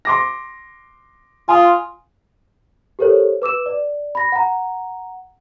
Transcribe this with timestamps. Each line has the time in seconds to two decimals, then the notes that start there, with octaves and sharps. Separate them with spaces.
0.05 C6 D6 A#6
1.48 F4 G#5 D#6
2.99 G4 A4 A#4 C5 C#5
3.42 B4 D6 E6 E7
3.66 D5
4.15 B5 A#6
4.32 F#5 A#5